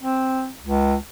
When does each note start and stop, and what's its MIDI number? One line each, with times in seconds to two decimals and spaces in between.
0.01 0.49 60
0.62 0.95 37